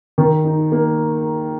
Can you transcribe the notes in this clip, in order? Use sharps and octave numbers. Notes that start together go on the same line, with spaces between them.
D#3
D#4
A#3